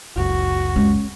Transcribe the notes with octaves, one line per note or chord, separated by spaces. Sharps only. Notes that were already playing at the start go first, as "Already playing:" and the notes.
F#1 C#2 F#2 F#4
G#3 C#4